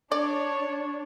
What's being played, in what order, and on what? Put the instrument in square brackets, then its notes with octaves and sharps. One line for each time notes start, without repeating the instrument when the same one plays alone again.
[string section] D4 [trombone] C#5 [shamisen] D5